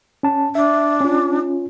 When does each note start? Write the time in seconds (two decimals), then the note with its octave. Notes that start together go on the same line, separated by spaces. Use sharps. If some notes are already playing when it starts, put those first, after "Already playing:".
0.23 C#4 A5
0.55 D4 E5
1.01 C#4 F4